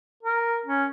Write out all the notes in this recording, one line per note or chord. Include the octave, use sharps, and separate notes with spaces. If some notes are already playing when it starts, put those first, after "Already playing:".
A#4
C#4